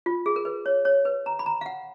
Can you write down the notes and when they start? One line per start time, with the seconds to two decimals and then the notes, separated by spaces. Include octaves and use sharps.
0.06 F4
0.26 G#4
0.36 A#4
0.45 B4
0.66 C#5
0.85 C#5
1.05 B4
1.26 A#5
1.39 B5
1.46 A#5
1.61 F5
1.66 F#5